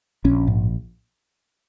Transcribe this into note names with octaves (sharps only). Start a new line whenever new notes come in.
A#1 C#4
G#2